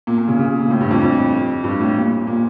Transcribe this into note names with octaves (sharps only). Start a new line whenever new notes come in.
A#2
A#2
C#3
C#3
A#2
A2
G2
F2
F2
G2
A2
A#2
A#2